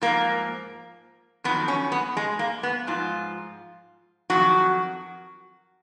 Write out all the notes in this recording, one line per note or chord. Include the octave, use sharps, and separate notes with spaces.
G#2 F3 A#3
F2 D#3 F#3 B3
C#4
B3
G#3
A#3
B3
G#2 F3 F4
F2 D#3 F#3 F#4